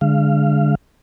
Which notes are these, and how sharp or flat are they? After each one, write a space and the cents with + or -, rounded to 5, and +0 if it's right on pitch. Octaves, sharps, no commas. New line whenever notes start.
D3 +0 G#3 +0 F5 -20